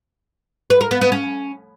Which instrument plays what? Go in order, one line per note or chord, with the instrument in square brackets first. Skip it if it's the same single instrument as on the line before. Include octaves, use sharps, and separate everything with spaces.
[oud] B4
A#4
B3
B3
C#4